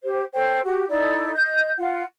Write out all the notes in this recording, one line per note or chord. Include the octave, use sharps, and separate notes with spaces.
G4 C5
A4 C5 C#5 G5
F#4 G4
D#4 E4 A4 D5
D#5 G6
F4 F#5